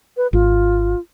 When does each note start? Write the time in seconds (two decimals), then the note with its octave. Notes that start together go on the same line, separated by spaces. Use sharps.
0.17 B4
0.33 G#1 F4